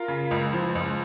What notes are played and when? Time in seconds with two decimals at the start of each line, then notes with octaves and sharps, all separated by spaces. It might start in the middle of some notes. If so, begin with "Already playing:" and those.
Already playing: F4 A#4
0.08 C#3
0.31 C#2
0.53 F3
0.75 C#2